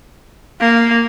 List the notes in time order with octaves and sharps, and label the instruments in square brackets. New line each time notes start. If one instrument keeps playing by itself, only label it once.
[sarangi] A#3